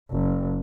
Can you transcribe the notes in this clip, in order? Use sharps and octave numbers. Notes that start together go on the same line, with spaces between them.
F#1